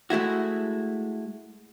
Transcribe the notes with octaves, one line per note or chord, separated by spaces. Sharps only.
G#3 A3 E4 F#4